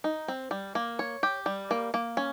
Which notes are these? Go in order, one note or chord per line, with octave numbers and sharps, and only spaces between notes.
D#4
C4
G3
A#3
C#5
G4
G3
A#3
A#3
C#4